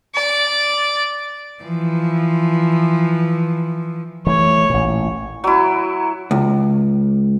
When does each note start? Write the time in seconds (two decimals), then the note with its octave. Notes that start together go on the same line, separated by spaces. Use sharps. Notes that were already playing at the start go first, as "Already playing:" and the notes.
0.15 D5
1.63 E3 F3
4.27 E3 A3 C#5
4.70 A1 A#2
5.44 F#3 E4
6.31 C#2